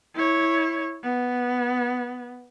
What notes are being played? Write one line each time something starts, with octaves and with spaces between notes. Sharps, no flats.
E4 C#5
B3